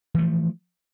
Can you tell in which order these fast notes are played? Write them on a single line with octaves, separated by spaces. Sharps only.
E3 A3 F3